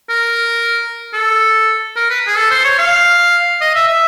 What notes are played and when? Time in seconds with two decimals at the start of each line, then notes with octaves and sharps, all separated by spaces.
0.10 A#4
1.13 A4
1.96 A#4
2.10 B4
2.27 G#4
2.37 A4
2.51 C5
2.65 C#5
2.78 F5
3.61 D#5
3.75 E5
3.88 E5